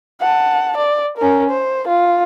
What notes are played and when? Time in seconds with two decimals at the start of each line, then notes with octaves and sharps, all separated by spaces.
0.20 F#5 A5
0.77 D5
1.18 C#4 A#4
1.50 C5
1.88 F4